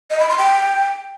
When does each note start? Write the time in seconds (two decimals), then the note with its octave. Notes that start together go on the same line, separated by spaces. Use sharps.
0.10 D#5
0.20 B5
0.29 C6
0.38 G5